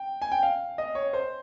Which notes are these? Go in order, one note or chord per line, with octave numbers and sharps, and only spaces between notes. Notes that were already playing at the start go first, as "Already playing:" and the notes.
Already playing: G5
G#5
G5
F5
D#5
C#5
C5